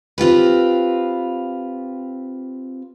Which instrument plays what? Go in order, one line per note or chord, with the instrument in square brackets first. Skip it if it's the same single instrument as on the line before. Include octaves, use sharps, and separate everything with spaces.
[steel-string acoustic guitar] C4 F4 G4 B4